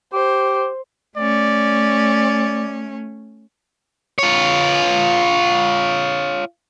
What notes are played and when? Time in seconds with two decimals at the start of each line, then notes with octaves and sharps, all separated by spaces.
0.13 G4 C5
1.17 A3 C#4 D5
4.19 F4 C#5